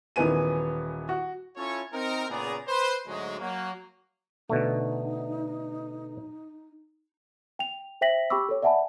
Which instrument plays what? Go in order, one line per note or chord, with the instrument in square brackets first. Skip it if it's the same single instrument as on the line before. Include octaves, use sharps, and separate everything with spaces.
[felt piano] D#1 D#3 E3 B3 G#5 D#7
F#4
[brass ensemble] C#4 E4 F4 A4 C#5
C4 D#4 A#4
A#2 C#3 B3 G#4 D5 A#5
B4 C5
D2 G#2 F#3 G#3
F#3 A#3
[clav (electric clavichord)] B2 D3 A3 [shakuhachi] D#4
[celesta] G5 F7
C5 E5 G5 A#6 B6 F#7
G4 G5 B5 C#6 D6 E6
A4 C#5
D5 E5 F#5 G#5 A5 B5